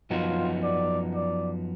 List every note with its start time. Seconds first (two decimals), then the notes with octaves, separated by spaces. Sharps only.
0.10 F#2 F3 B3 D#4 F4 F#4
0.63 D5
1.15 D5